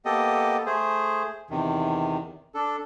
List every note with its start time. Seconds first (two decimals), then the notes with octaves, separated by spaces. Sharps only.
0.05 A#3 B3 G4 A4 D#5
0.66 A3 G#4 C5
1.50 E2 C3 D#3
2.55 D4 A4